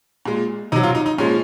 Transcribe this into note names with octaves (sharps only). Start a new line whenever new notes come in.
A#2 G#3
C3 F#3 D#4
F4
D#4
D#4
A#2 F3 G#3 C#4